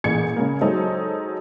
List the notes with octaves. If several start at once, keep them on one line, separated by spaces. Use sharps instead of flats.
A1 A#2 G#4 G#6 C#7
C#3 G#3 A#3
F#3 G#3 D#4 A4 C5